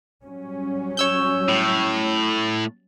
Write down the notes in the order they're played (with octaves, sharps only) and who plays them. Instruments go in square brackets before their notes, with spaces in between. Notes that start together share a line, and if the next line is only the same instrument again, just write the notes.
[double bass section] F#3 G3 C#4
[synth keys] C#5 E6 G6
[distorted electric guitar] A2